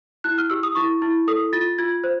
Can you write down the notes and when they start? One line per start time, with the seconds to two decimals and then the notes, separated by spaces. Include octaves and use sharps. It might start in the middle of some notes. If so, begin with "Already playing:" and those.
0.24 E4 F#6
0.38 F6
0.50 G4 E6
0.63 D#6
0.75 E4 C#6
1.02 E4
1.27 A4 D#6
1.53 F4 A6
1.78 F4 G#6
2.04 C5